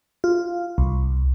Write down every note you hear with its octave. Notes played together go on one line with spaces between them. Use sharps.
F4
C2